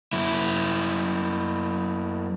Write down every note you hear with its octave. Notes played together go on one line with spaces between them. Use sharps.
F#2 E4